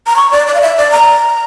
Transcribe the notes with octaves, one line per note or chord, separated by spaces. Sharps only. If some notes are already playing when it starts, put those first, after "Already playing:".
A#5
C#6
D5
D5
F5
E5
D5
A#5